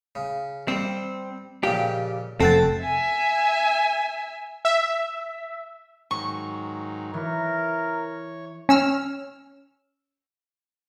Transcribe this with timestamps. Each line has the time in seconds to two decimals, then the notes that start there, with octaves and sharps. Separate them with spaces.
0.15 C#3
0.68 G3 C4
1.63 F2 A#2 C#3 G4
2.40 F1 C4 F#4 A4 F#5 G5 A6
2.81 E5 G#5
4.65 E5
6.11 G#2 D#3 F#3 C#6
7.14 E3 A#4 C#5
8.69 C#4 E6 F6